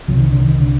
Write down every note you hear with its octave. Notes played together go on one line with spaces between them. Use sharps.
C2 C3 F3
D#3
D3
D#3
D3